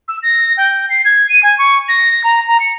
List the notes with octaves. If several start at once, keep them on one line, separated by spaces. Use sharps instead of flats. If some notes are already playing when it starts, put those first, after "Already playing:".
E6
A#6
G5
C7
G#6
D#7
G#5
C#6
A#6
A#5
A#5
C#7